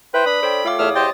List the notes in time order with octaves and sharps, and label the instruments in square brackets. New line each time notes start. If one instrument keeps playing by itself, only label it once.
[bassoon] E4 [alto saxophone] B4 [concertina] C5 G5
[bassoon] D4 [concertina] B5 [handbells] D#6
[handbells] A4 C#5 G5 [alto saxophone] C5
[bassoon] A3 [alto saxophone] F4 [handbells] C#5 F5 D6
[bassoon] E2 [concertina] A3 E5 F6 [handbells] C#5 D#6
[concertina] G4 C5 D#5 [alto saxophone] G5 [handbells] A6